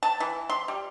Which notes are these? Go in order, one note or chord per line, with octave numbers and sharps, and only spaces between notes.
A5
E3
C6
G3